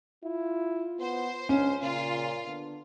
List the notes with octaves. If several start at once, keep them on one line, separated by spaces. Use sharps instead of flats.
E4 F4
B3 C5
C#2 C#4 D4
A#2 C#3 F4
D3 B3 D4